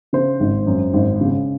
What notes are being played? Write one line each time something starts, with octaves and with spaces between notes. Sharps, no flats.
C#3 C5
G#1
F#2
G#1
C#3